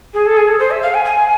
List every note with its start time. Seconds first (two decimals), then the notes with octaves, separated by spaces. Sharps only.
0.13 G#4
0.26 A4
0.37 G#4
0.48 A4
0.59 C5
0.70 E5
0.82 F5
0.94 G#5
1.04 G#5